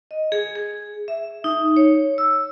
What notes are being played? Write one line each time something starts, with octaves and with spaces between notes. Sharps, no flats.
D#5
G#4
G#4
E5
D#4
C#5
E6